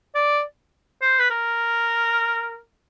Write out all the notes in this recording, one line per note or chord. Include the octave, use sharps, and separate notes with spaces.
D5
C5
B4
A#4